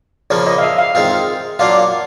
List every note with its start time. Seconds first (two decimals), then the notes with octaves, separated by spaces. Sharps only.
0.30 C#3 F3 A#3 C#4 D5
0.47 D#5
0.58 F5
0.63 E5
0.79 F5
0.95 D#3 G#3 C4 F4 F5
1.59 F#3 A#3 D4 F4 F5